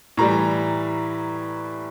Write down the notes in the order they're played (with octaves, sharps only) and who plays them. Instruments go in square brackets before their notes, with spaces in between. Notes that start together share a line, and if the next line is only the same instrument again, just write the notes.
[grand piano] A2 E3 G3 A#5